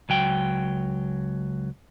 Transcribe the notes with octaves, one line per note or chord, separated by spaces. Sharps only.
C#2 F#3 G5